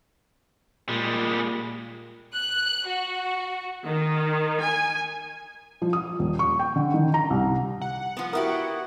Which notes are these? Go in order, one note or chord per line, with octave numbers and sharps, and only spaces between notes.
A#2 G3 G#3
F#6
F#4
D#3
G#5
F3
D#6
D#1
C#6
G5
D3
D#3
A#5
C2
F#5
F3 B3
B3 E4 F#4 G4 A#4